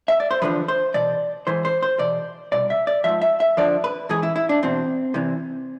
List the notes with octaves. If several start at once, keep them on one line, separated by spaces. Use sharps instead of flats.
E5
D5
C5
E2 D3 F3 B4
C5
E2 B2 D5
G#2 E3 C5
C5
C5
E2 B2 D5
C2 B2 D5
E5
D5
G#2 F3 E5
E5
E5
F2 D3 F3 D5
B4
G#2 E3 G#4
E4
E4
D4
E2 B2 C4
E2 C3 E3